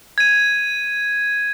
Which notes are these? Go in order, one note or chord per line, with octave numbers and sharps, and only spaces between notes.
G#6 D#7